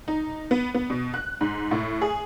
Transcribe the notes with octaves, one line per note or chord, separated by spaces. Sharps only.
D#4
B3
B3
B2
F#6
G#2
A2
G#4